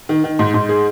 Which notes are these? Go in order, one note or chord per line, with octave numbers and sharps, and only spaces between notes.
D#3
D#3
G#2
G#2
G#4